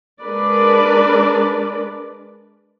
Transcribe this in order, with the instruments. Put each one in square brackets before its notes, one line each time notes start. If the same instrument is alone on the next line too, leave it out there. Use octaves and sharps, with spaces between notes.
[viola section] G#3 D4 A#4 B4 D5